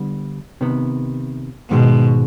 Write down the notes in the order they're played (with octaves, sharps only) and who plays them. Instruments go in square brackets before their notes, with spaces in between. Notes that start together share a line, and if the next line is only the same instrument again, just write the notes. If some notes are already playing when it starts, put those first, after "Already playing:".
Already playing: [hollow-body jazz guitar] D3 G3 B3
C3 D#3 B3
[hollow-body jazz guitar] G#2 D#3 G#3 [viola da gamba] B2